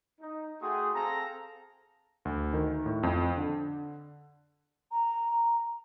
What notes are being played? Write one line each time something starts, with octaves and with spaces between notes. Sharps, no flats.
D#4
A3 F#4 G#4 G5 C6 D#6
C4 G#4 A4 F5 A#5
D2
D#3
A2
F2
D3
A#5